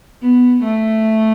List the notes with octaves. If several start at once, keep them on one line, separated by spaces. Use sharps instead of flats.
B3
A3